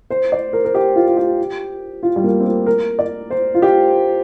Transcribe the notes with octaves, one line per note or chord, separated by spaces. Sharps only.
C5
D5
A#4
A#4
G4
F4
F4
G4
F4
G3
A#3
C4
A#3
A#4
D5
C5
F4
G4